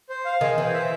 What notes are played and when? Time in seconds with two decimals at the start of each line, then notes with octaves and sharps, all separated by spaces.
0.09 C5
0.25 F5
0.41 D#3 G#4
0.58 E3 C5
0.74 E5